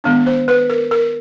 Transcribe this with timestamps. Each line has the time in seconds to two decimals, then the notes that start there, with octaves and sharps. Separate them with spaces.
0.04 D#3 G#3 B3 D4
0.26 C5
0.48 B4
0.70 A#4
0.91 A#4